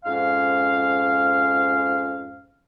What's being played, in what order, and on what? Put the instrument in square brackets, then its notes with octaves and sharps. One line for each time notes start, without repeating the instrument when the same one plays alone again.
[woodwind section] F2 G#2 C#4 F5